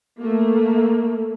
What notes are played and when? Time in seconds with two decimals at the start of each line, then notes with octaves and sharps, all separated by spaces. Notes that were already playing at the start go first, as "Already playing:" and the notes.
0.19 A3 A#3